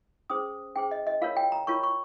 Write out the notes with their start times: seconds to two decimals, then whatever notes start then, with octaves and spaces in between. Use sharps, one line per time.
0.30 C#4 G#4 C5 D#6
0.76 C#4 G#4 C5 G5
0.91 D#5
1.07 D#5
1.21 F4 A#4 C#5 F5
1.37 G5
1.52 A#5
1.67 F4 A#4 C#5 C#6
1.83 C#6